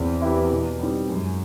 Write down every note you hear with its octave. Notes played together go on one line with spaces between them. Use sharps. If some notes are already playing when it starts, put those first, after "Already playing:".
Already playing: E2 C4
E4 G4 B4
B2
G3 C4 D#4
F#2 G#3